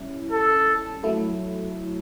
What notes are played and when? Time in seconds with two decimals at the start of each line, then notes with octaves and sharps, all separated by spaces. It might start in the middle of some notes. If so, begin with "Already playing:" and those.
Already playing: G3 C#4 E4
0.32 A4
1.03 F#3 A3 E4 A4